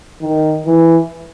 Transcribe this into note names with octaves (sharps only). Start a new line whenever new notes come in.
D#3
E3